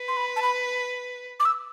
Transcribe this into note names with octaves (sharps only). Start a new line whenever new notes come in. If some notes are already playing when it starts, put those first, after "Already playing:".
Already playing: B4
C6
B5
A5
B5
D6
E6